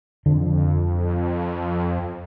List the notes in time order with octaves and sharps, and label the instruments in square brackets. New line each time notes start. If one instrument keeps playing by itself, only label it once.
[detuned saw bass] F2 [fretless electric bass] D3